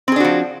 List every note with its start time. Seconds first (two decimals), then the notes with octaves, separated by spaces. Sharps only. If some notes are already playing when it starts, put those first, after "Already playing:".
0.08 C4
0.12 G#4
0.16 D4
0.20 F#4
0.25 F3